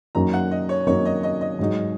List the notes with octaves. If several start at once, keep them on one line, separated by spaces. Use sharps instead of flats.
F#2 F#3 A#3 D#4 A#5
F#5
D#5
C#5
F#2 F#3 A#3 D#4 C#5
D#5
D#5
D#5
G#2 F#3 D#4